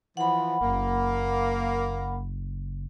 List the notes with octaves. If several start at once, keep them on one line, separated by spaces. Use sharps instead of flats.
E3 F3 F#5 B5
F#1 A#3